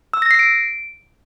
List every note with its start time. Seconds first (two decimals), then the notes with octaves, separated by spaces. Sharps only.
0.14 E6
0.22 A#6
0.31 C7
0.39 D7